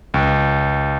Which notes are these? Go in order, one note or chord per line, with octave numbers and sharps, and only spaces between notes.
C#2